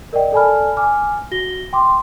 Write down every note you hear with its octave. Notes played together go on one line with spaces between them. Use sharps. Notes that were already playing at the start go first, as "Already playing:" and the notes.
A#4 D5 D#5 G5
A4 D5 G#5 A5 B5 F6
G#5 D6 F6
F#4 A#6 G7
G5 C6 D6